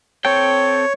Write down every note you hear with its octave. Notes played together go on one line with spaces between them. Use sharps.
C4 A4 C#5 G5